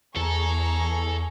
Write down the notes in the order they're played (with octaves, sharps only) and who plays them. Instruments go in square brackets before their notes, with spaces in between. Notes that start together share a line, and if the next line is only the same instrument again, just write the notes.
[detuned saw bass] E2 [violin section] G#4 A#5 C#6 [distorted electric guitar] A4